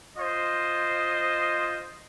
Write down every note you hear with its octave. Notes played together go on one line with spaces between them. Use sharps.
F4 C5 D#5